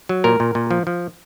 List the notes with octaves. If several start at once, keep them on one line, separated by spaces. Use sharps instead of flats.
F#3
A#2 A#4
A#2
A#2
F3
F3